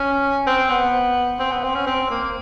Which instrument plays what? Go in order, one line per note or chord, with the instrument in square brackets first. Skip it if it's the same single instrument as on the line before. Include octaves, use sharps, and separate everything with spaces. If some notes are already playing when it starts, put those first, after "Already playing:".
Already playing: [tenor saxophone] C#4
C4
B3
C4
B3
C4
C#4
C4
A#3